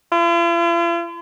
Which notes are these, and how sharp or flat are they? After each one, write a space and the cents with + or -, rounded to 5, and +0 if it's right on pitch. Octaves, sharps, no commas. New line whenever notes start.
F4 -45